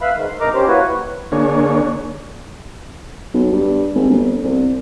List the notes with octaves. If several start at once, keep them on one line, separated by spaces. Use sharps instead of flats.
B4 E5 F5 B5
G#2 D#3
C6
G2 B2 D#4 A#4 A#5 D6
C#4 G4 C5
A#3 E4 F#4 B4 C#5
D3 A#3 D4 G#4 C#5
B1
G2
G#1
G1
C2